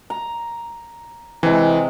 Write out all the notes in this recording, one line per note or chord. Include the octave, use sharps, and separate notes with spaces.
A#5
C3 E3 G#3